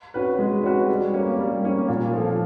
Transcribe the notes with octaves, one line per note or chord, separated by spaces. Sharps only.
C#4 F#4 B4
G#3
C#4 F#4 B4
G3
A#3 C#4
G3
A#3 C#4
A#2
F3 A3